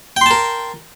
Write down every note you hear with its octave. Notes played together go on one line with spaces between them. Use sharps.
A#4 G5 A5 C6